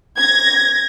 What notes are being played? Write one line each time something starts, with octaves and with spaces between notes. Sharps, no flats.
G#6 A#6